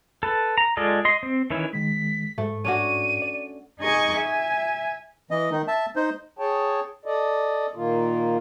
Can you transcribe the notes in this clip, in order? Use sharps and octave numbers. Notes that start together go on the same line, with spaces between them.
A4 B4
A#5
G#3 F4 A4 D5 D#5
D#5 C6
C4
D#3 E3 C#4 E4
D#3 G#3 B6
G#2 A3
C#4 D4 F#4 D#7
D5
D#4 G#4 D#5 G#5 C#6 D6
E5 G#5
E3 D#5
D#3 D#4
E5 A5
D#4 C5
G#4 C#5 G5 A5
A4 D5 D#5
A#2 D#3 A#3 F4